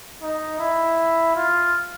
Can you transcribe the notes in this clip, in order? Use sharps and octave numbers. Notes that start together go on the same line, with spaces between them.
D#4
E4
F4